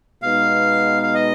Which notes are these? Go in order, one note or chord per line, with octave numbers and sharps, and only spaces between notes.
B2 G#3 B3 D#4 F5
F5
D#5